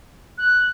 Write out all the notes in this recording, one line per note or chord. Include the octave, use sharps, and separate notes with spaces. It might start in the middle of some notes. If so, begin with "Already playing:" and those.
F#6